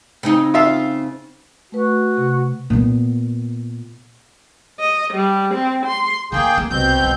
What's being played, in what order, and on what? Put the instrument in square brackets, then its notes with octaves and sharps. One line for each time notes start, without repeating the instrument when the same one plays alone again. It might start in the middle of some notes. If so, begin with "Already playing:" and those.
[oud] C#3 C4 D#4
[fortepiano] F4 E5 F5
[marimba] A3 B4 [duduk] F#4
[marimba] C3
[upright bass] A#2 B3
[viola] D#5
G3
C4
C6
[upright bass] D3 D4 [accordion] A#3 G#4 G5
[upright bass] A#3
[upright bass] C2 [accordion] B2 C4 G6
[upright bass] C#2